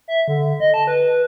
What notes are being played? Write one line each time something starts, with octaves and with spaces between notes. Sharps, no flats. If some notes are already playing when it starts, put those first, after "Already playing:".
E5
D3
D#5
A5
B4